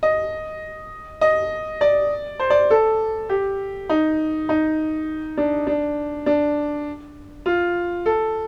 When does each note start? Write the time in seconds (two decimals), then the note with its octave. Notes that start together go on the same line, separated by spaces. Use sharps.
0.03 D#5
1.21 D#5
1.81 D5
2.40 C5
2.50 D5
2.70 A4
3.29 G4
3.89 D#4
4.49 D#4
5.37 D4
5.67 D4
6.26 D4
7.46 F4
8.06 A4